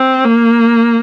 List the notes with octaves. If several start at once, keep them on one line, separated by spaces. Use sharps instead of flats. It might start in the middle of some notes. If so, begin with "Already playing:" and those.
Already playing: C4
A#3